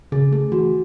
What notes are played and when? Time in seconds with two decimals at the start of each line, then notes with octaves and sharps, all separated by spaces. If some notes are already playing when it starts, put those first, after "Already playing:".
0.12 C#3 G#4
0.32 A3 G#4
0.52 E3 F#4